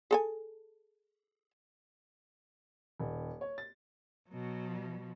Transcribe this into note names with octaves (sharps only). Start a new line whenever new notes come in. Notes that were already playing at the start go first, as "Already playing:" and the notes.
G#4 A4 G#5
D#1
C#5
A6
B2 F#3